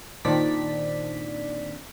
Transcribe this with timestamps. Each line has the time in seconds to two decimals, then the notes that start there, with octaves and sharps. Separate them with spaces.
0.25 A#2 D#3 C4 D4 D5 B6